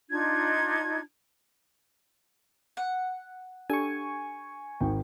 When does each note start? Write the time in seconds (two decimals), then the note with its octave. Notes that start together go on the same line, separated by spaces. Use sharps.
0.09 D4 D#4 F4 G#6
2.77 F#5
3.70 D4 G4 A4 G#5 C#6
4.80 G#1 D#3 G5